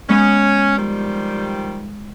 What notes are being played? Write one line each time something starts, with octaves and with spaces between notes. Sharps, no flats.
G#3 B3 C#4
D#3 F3 G3